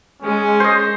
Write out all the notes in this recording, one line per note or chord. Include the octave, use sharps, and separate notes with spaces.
G#3 C#4
C5 D#5